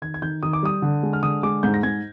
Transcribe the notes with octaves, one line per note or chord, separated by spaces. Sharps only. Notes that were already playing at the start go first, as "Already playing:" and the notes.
D#3 G#6
G#6
D#3 G6
D#3 D#6
D6
G3 D#6
D3
G#3
F6
D3 D#6
G#3 D6
G#2 G6
A#6
G#2 G#6